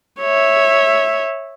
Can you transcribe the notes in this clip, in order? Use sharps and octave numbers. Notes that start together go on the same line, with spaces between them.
C#5 E5